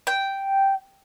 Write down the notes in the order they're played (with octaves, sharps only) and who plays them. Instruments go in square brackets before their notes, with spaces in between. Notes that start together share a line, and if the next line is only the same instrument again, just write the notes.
[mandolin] G5